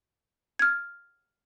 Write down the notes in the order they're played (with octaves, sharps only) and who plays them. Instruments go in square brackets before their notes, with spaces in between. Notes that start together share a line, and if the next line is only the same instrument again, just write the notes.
[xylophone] F6 G#6